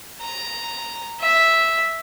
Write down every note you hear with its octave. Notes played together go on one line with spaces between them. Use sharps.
A#5
E5